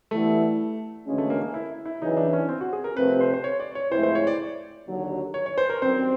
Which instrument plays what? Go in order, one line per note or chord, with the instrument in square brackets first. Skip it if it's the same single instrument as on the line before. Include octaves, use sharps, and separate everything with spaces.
[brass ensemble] E3 G3 B3 E4 A4 [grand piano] A3
[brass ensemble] D2 C#3 E3 G#3 C#4
[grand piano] A3
A#3
A#3
E4
E4
[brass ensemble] F#2 C#3 E3 [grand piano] D#4
[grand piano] D4
C#4
C4
F#4
G#4
A#4
[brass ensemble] C3 F3 A3 C4 [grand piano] B4
[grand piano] B4
C5
C5
C#5
D5
C#5
[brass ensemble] A2 F3 G#3 C4 E4 [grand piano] C5
[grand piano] C5
C#5
D5
[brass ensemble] D#2 D3 F#3
[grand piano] C#5
C#5
C5
A#4
[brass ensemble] F#2 D#3 G3 C4 [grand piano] C5